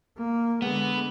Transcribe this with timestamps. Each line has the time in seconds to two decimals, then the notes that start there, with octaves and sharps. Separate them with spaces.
0.17 A#3
0.62 D3 G#3 B3